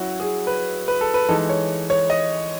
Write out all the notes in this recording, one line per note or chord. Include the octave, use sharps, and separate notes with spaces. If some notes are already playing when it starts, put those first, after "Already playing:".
Already playing: F#3 C#4 E4 F#4
G#4
B4
B4
A4
B4
E3 G#3 D#4 A4
C#5
C#5
D#5